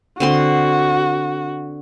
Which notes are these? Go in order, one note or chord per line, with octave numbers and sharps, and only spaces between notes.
D3 C4 F#4 C6